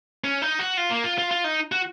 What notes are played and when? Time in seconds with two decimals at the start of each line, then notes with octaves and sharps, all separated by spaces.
0.24 C#4
0.42 D#4
0.59 F#4
0.77 F4
0.91 A#3
1.04 F4
1.18 F4
1.31 F4
1.44 D#4
1.72 F#4